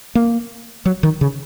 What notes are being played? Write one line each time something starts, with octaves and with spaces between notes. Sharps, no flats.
A#3
F#3
D#3
C#3